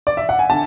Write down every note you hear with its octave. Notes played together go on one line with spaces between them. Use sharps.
D5
E5
F#5
G#5
D3 A5